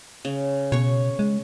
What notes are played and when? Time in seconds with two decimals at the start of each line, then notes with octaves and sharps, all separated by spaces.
0.25 C#3
0.72 B2 C#5 C#6
1.19 G#3